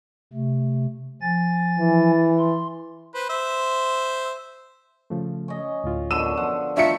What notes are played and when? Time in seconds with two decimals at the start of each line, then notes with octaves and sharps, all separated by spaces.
0.33 C3 A3
1.22 F3 G#5 A6
1.80 E3
2.39 C6
3.14 B4 C5
3.29 C5 E5
5.10 C#3 F3 A3
5.48 C#4 D#5
5.84 D2 A2 F4
6.11 F#2 B2 D3 E6 D#7 E7
6.37 F3 F#5
6.77 D#3 A3 D4 F4 E5 C#7